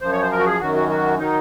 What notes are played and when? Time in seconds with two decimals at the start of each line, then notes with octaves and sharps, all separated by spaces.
0.01 F#2 F3 C5
0.12 C#5
0.22 C5
0.32 A#4
0.39 F#4
0.46 G#4
0.60 F#2 D#3 F#3 F#4
0.75 F#4
0.89 F#4
1.18 D#3 F#3 D#4